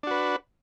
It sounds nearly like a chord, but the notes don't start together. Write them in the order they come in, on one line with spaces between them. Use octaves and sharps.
D4 F#4 B4